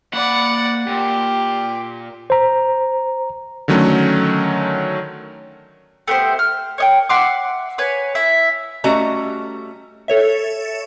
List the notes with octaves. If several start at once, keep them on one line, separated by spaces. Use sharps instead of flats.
A#3 D5 F#5 B5
A#2 G4
C5 A#5
D3 D#3 F#3 A3 C#4
A3 B3 G4 C5
F6
C#5 D#5 G5
E5 F#5 C6 D6
B4 C#5 G#5
E4 E5
G3 A3 C#4 F#4 D#5 A#5
A4 C#5 E5